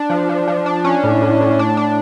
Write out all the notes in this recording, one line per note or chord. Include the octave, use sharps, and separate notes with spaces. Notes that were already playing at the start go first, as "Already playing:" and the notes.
Already playing: D4
F3
F3
F3
D4
C#4
A2
A2
A2
D4
D4